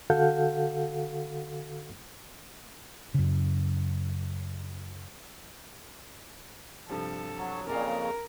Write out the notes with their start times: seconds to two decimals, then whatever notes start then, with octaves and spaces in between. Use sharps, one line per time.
0.10 D3 F#4 A4 F5 F#5 G6
3.14 F#2 C#3
6.89 G2 C3 F3 A4
7.37 F#3
7.67 F2 A#2 C#3 C#4 A#4 D5 F5